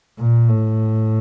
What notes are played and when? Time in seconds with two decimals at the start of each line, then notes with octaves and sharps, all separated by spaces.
0.19 A#2
0.49 A2